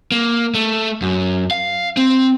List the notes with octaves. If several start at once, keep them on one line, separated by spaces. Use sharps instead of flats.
A#3
A3
F#2
F5
C4